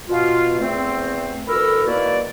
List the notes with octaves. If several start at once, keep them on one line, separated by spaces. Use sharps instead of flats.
B2 F4
E2 A3 C4
D2 E3 A4 A#4 B5 E6
D#3 E3 A#3 E4 F#4 D5